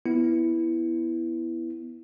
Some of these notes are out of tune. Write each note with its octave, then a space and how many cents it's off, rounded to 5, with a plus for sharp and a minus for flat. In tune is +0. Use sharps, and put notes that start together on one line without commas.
B3 +0 E4 +0